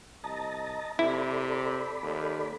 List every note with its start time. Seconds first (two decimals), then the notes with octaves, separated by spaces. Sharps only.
0.24 C2 D#5 A5 A#5
0.99 C3 E4 A4 D5 B5
2.03 D#2